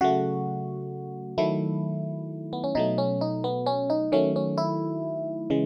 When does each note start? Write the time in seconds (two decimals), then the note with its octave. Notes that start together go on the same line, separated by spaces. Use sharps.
0.01 C#3 F#3 A3 F#4
1.38 D#3 F#3 A3 E4
2.53 B3
2.64 C#4
2.75 B2 F#3 A3 D#4
2.98 C#4
3.21 D#4
3.44 B3
3.66 C#4
3.90 D#4
4.12 D#3 F#3 A3 C#4
4.36 C#4
4.58 E4
5.50 C#3 E3 G#3